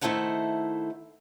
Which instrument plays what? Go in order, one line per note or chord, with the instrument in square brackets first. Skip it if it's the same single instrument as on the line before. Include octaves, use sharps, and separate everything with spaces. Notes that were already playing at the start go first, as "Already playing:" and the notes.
[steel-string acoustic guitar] D#3 A3 E4 A4 C5 F#5